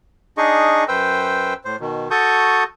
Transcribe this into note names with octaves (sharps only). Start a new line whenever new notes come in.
D4 D#4 G#4 D#5 C#6
F#2 B4 C5 G5 E6
A2 C5
B2 D#3
F#4 A4 A5 C#6 D#6 G6